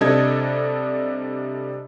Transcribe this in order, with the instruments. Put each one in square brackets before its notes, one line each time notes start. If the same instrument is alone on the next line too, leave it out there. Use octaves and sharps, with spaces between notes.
[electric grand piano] C3 G3 D4 A4 D#5 G#6